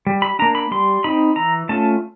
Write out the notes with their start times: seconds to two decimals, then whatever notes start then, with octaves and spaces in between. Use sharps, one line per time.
0.07 G3
0.22 B5
0.39 A#3 D4 A#5
0.55 B5
0.71 G3 C6
1.04 C4 D#4 B5
1.36 E3 A#5
1.69 A3 C#4 F4 A5